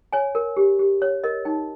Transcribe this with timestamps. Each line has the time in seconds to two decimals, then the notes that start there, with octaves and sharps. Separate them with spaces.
0.13 C#5 G#5
0.35 A#4
0.57 G4
0.79 G4
1.02 C#5
1.24 A#4 D#5
1.45 D#4 G5